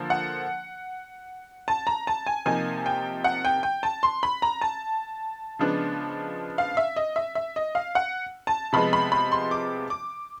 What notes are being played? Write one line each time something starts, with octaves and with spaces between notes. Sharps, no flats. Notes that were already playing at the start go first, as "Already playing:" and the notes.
Already playing: D3 F3 A#3
F#5
A5
A#5
A5
G#5
C3 F3 A#3 D#4 G#5
G5
F#5
G5
G5
A5
C6
B5
A#5
A5
C#3 F3 G#3 B3 D4
F5
E5
D#5
E5
E5
D#5
F5
F#5
A5
C3 F3 G#3 B3 B5
B5
B5
C6
D6
D6